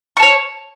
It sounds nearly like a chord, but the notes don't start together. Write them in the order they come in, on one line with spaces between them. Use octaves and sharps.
C#6 A5 C#5